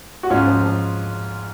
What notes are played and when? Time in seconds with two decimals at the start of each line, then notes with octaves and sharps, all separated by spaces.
0.23 F#4
0.30 G#2 C#4 F4
0.46 F3
0.63 F3